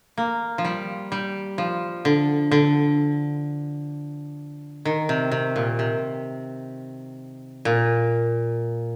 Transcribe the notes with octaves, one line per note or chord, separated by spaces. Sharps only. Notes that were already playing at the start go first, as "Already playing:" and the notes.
A#3
F3
G3
G3
F3
D3
D3
D#3
C3
C3
A#2
C3
A#2